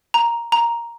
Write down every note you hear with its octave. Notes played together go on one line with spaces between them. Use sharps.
A#5
A#5